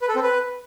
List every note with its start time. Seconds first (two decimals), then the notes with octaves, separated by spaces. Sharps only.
0.02 B4
0.09 A4
0.16 C4
0.23 B4